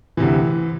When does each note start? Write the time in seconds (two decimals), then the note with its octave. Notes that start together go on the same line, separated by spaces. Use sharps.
0.17 D2 C3 E3